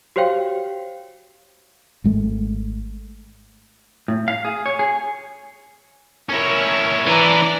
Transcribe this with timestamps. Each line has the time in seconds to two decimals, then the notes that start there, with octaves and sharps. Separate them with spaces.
0.16 F#4 G4 C5 C#5 F5 G5
2.04 G#1 G#3 A3
4.08 A2
4.28 F5
4.45 G#4
4.66 C#5
4.79 G#4
6.29 C#4 E4 A#4 C#5
7.07 E3 D4 D5 A#5